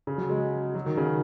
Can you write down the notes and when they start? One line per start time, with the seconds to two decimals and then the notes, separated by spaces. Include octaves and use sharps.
0.07 C#3
0.18 F#3
0.29 G#3
0.75 F#3
0.86 D#3
0.97 C#3